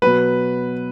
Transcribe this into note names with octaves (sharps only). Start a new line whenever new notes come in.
B2 F#3 B4 B5